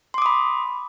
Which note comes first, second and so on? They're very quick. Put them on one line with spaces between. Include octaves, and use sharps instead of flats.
C6 D6 D#6 B5